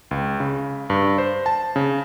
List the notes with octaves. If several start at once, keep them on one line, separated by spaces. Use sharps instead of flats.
C#2
C#3
G2
C5
A5
C#3